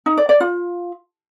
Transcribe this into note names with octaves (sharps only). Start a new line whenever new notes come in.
D#4
D5
D5
F4